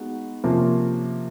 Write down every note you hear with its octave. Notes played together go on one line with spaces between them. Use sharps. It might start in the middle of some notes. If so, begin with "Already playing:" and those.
Already playing: G#3 B3 D#4 F#4
C3 F3 A#3 C#4 F4